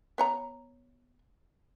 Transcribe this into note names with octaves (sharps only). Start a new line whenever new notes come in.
B3 C#5 A#5